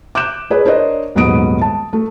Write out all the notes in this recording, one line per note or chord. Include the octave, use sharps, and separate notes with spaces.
D6 F#6 G6 E7
G#4 B4 C#5
D4 A#4 C5 C#5 D#5
D#1 G#2 F#3 B3 D#6 D7
A5
A3